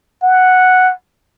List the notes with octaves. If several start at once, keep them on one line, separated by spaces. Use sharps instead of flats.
F#5